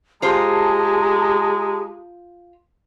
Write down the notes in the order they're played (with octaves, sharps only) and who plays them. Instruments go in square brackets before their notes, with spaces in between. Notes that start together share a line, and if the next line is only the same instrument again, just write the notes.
[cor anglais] G#3 [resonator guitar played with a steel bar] F4 C5 [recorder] G4 [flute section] G#4 A5 A#5